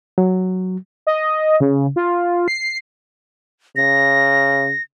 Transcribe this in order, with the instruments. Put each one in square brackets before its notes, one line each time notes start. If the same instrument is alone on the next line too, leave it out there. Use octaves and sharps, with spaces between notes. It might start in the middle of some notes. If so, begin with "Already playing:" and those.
[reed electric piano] F#3
[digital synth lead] D#5
C#3
F4
C7
[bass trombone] C#3 [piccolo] A#6